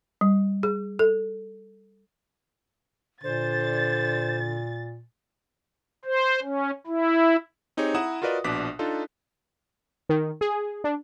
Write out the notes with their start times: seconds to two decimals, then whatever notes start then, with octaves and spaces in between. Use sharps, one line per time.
0.21 G3
0.63 G#4
0.99 A4
3.23 A#2 D3 C5 A6
6.05 C5
6.42 C#4
6.87 E4
7.77 C4 D#4 G4 G#4 C#5
7.94 E4 F#5 A#5 D#6 E7
8.22 F4 F#4 A#4 B4 D5 D#5
8.44 A#1 B2 D4 D6 F#6 B6
8.79 D4 D#4 F4 A4
10.09 D#3
10.41 G#4
10.84 D4